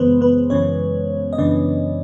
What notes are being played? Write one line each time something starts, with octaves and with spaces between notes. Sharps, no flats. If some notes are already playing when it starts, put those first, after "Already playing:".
Already playing: F#2 C#3 E3 G#3 B3 B4 C5
B3 B4
F#2 C#3 E3 C#4 C#5
D#5
F#2 C#3 E3 D4 D5